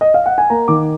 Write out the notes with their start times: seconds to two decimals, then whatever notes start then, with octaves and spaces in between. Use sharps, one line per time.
0.01 D#5
0.14 F5
0.26 F#5
0.38 G#5
0.50 A#3 A#5
0.68 D#3 D6